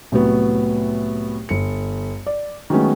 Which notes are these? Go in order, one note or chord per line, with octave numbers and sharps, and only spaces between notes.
C2 A2 F#3 B3
G1 C#7
D5
D#3 F#3 G#3 A3 B3 C#4